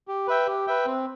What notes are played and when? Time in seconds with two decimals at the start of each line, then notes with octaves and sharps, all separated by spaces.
0.08 G4
0.28 B4 E5 G5
0.47 G4
0.67 B4 E5 G5
0.86 C4